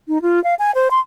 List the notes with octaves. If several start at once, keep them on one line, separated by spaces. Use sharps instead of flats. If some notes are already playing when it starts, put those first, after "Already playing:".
D#4
F4
F5
G#5
C5
C6